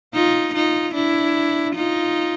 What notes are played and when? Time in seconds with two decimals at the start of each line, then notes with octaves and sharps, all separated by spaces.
0.14 D#4 F4
0.54 D#4 F4
0.95 D4 E4
1.75 D#4 F4